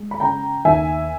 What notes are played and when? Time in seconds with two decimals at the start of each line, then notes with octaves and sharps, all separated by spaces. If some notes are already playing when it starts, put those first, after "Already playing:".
Already playing: G#3
0.11 B5
0.20 C#3 G5 A#5
0.65 D#2 E5 G#5